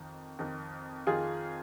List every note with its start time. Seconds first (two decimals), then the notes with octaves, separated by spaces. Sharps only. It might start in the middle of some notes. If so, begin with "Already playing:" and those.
Already playing: F2 D#3
0.39 F2 D#3
1.07 F2 D#3 F4 G#4